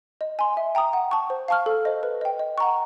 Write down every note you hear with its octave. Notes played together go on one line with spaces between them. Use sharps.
D#5
G#5 C6
E5
G5 A#5 D#6
F#5
A5 C#6
C5
F5 A5 C#6 F6
A4
C5 D#5
B4
D#5 G5
D#5
F#5 A#5 C#6